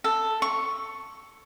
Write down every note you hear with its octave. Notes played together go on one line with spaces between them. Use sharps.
A4
C#6